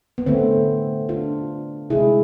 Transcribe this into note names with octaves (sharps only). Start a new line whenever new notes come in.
B3
D3 A3 C4
D4 F4
C3 G#3 E4 G#4